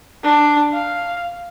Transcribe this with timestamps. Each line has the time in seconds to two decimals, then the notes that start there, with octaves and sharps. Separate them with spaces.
0.24 D4
0.72 F5